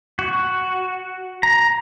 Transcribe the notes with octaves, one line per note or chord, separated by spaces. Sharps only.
F#4
A#5